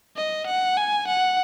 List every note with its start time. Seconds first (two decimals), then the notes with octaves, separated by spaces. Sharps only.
0.17 D#5
0.47 F#5
0.77 G#5
1.07 F#5